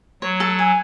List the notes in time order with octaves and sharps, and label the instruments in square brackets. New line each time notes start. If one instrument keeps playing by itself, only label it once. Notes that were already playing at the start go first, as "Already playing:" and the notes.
[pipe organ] F#3 [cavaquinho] C#5
[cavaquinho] A4
G#5